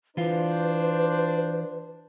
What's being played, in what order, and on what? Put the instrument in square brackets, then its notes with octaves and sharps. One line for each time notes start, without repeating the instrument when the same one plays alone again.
[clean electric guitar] E3 F4 [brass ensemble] D4 C5 [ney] B4